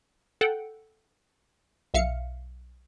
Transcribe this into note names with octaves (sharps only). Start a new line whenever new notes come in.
A4 F#5 G5
B1 E5 F5 C#7